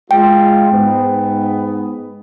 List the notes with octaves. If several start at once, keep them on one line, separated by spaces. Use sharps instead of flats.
G#3 F4 G5
G#2 B3